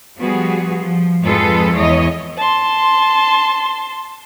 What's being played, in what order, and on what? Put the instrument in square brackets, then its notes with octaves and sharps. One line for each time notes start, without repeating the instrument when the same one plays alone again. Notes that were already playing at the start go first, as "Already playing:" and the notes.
[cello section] F3 G3 B3 F#4 G#4
F3
F2 G#2 F4 G#4 A4 B4
E2 E4 C#5 D#5
[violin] A5 C6